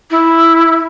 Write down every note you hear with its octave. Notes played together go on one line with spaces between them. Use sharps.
E4